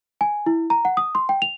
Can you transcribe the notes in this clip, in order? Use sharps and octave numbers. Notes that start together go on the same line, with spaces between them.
G#5
E4
A#5
F#5
D#6
C6
G5
F7